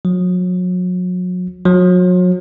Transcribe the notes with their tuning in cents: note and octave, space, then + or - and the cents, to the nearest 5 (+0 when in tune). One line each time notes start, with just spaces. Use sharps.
F#3 -35
F#3 -35